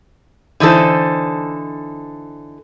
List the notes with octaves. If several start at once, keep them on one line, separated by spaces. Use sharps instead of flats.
D3 E3 D#4 A4 C5